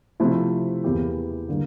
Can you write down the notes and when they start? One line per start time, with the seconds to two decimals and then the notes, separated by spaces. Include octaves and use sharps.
0.20 C3 F3 A3 C4 E4
0.84 E2 E3 A#3 E4 G4
1.49 D3 G3 A#3